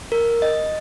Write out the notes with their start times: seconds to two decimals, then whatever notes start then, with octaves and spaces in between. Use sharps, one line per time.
0.12 A#4
0.42 D#5